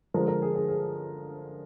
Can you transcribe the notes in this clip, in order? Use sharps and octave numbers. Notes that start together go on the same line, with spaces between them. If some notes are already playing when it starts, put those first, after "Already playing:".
D3 F3 G#3 A#4
A#4
G#4
G#4
G#4